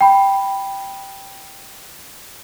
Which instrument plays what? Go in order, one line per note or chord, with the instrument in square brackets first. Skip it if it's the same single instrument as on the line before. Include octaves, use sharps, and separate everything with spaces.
[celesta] G5 B5